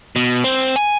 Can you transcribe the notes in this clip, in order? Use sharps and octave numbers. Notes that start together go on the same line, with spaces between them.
B2
C4
G#5